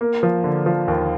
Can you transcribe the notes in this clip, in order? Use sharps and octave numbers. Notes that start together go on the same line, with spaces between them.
A#3
F3
D3
F3
D#2